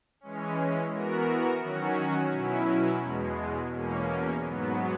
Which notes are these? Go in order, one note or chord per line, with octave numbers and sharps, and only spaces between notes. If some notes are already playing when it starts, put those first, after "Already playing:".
E3 G#3 C#4
E3 B3 F#4 A#4
D#3 F#3 C#4 F#4
B2 F#3 C#4 E4
E2 B2 G#3
E2 B2 A#3 C#4
G#2 F#3 B3